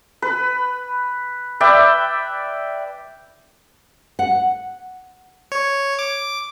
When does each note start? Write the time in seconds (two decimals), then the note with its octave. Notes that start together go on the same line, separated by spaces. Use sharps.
0.22 B4
1.60 B4 D5 E5 G5
4.19 F#5
5.52 C#5
5.99 D6